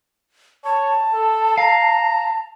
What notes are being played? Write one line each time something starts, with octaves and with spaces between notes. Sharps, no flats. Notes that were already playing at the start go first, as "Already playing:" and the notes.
C#5 A5
A4
F5 A#5